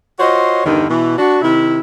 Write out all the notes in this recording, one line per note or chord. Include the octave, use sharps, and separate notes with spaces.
F4 F#4 C5 C#5 D#5
E2 G2 D3 D#3
B2 E3
D4 F#4
C3 D#3 E4